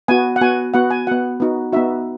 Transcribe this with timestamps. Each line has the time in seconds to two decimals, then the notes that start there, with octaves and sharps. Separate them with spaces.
0.08 B3 F#4 G#5
0.36 F#5
0.41 B3 F#4 G#5
0.74 B3 F#4 F#5
0.90 G#5
1.07 B3 F#4 F#5
1.40 B3 D#4 F#4
1.73 B3 D#4 F#4 E5